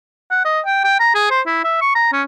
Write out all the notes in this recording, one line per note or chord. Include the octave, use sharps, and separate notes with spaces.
F#5
D#5
G5
G5
A#5
G#4
C5
E4
E5
C#6
A#5
C#4